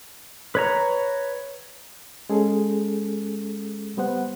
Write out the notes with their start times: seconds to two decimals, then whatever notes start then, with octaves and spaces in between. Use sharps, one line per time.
0.55 B4 C#5 A#5
2.30 G#3 C#4 G#4 A4
3.97 G3 B3 C5 F#5